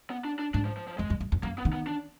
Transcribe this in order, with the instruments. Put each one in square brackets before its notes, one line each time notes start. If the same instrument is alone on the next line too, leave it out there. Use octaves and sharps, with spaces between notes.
[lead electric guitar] B3
D4
D4
[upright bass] G#2 [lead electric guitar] D4
[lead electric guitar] F3
F3
F3
[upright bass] F2 [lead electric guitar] G#3
[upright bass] F#2
F#2
F2
[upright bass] F#2 [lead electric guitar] A#3
[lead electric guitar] B3
[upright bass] D#3
[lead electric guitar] B3
D4